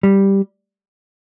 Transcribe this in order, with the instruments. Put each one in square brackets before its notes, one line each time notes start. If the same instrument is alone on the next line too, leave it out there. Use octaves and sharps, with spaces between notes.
[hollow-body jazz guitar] G3